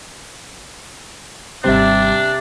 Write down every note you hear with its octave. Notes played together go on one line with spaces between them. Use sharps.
G#1 C3 G3 D4 C5 E5